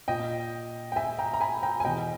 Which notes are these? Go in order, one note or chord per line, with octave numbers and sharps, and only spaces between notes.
A#2 D#5 G5
G5
E5 G#5
G5 A#5
A#5
G#5 B5
G5 A#5
G#5
E2 B2 D#5 G5